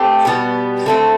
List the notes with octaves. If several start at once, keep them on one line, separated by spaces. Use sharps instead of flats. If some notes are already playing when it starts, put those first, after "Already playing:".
Already playing: A3 C4 G4
B2 G3 B3
D3 A3 C4